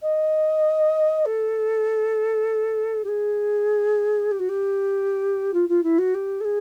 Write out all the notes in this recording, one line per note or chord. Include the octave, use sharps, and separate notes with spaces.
D#5
A4
G4
G#4
G4
F#4
G4
F4
F4
E4
F#4
G4
A4
G#4